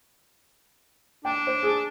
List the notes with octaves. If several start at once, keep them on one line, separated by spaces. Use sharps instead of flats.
D4 G5
C5
G#4